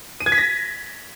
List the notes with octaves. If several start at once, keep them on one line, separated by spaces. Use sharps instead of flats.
D#7
G#6
B6
A#6